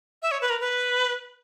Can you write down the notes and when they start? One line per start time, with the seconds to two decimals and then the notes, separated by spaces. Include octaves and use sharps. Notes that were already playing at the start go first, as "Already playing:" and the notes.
0.22 E5
0.31 C#5
0.41 B4
0.50 A#4
0.60 B4